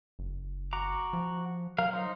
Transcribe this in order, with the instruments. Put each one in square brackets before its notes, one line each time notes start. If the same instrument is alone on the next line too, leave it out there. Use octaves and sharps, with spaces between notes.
[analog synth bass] F#1
[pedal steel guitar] F#4 A#5 D6
[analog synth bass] F3
[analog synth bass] F#3 [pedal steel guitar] A#4 F5
[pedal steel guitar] D#4 C5